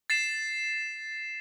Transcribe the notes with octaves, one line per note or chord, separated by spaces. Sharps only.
A6 C7 E7